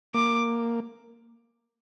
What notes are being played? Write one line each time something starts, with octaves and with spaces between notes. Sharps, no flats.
A#3 D6